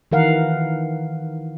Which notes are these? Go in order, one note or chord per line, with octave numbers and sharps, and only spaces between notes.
D#3 E3 A#4 F5 F#5